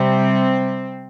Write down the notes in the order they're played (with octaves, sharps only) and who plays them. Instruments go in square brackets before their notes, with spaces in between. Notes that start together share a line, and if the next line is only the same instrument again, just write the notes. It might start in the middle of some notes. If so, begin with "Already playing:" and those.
Already playing: [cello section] C3 G3 C4